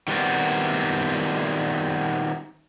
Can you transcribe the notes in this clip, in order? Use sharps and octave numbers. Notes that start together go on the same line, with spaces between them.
D#3 G3 B3 C4 F#4